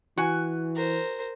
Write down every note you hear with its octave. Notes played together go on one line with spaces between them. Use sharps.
E3 F#4 G#5
A#4 C5